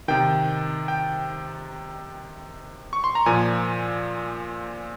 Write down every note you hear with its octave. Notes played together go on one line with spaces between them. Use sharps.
C3 D#3 G5
G5
C#6
C6
A#5
A#2 F3 G#5